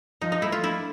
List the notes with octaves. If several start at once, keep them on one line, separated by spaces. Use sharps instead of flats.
F3 D#4
D#4
A3 E4
F4
D4 E4